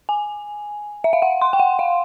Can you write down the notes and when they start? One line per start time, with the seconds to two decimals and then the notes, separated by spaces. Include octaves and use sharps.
0.09 G#5
1.04 E5
1.13 F5
1.22 F#5
1.42 C6
1.53 G5
1.60 F#5
1.79 F5